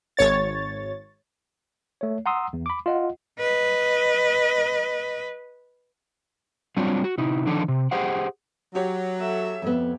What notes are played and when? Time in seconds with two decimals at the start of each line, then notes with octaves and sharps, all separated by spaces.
0.17 G#1 C#5 A6
2.01 A3 C#5
2.26 F#5 A#5 C6 D#6 E6
2.53 E2
2.66 B5 D6
2.86 F4 D#5 F#5
3.39 B4 D#5
6.77 F#3 G3 C4 D4 F4 C#5
7.04 F#4
7.18 C3 D#4 E4
7.45 D3 D#3 F3 D4 D#4 A4
7.68 C3
7.91 G4 G#4 C5 D#5 F#5 G5
8.75 F#3 G4 C#5
9.20 A4 E5
9.62 F2 B3